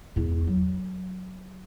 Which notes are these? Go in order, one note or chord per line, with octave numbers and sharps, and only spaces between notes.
E2 E4
F#3